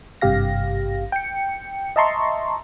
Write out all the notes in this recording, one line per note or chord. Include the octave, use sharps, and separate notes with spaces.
G#1 G2 C3 G4 F5 A#6
G5 C#7
D#5 E5 A5 A#5 C6 C#6